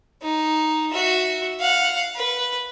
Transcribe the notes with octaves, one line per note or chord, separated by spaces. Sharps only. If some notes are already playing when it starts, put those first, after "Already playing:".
D#4
F#4 E5
F5 F#5
B4